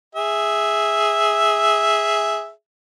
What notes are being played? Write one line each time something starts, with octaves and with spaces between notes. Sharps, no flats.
G#4 E5